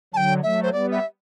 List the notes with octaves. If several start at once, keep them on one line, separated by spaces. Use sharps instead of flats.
D3 F#3 G5 A5
F#3 A3 E5
C5
G3 B3 D5
E5